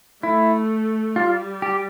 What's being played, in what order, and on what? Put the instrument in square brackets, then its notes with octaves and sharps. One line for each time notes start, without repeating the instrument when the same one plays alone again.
[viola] A3 [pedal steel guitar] E4
[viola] G3 [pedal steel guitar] F4
[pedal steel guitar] G4